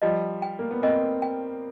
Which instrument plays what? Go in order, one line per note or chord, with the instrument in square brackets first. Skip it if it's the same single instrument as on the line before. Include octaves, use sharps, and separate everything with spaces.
[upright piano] F3 G3 [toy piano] D#5
[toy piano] G5
[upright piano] A#3
B3
[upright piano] A#3 C4 [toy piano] D#5
[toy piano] G5